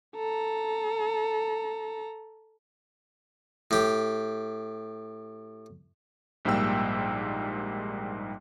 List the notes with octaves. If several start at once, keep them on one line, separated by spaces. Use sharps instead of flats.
A4 A#5
A2 G4
A#1 G#2 G3 A#3 G5 E6